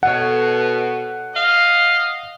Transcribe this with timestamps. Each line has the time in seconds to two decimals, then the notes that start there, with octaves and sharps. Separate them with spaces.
0.03 B2 A4 C#5 F#5
1.35 D#5 F5